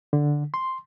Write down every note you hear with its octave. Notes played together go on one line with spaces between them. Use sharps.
D3
C6